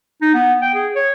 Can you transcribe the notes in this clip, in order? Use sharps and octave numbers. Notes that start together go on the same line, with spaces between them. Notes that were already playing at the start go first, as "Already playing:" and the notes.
D#4
B3
G5
G#4
C#5